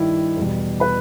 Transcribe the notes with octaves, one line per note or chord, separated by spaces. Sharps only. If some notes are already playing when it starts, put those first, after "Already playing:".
Already playing: G2 D#3 G3 E4
E2 B2 G3
B4 B5